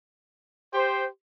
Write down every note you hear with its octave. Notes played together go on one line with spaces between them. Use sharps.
G4 C5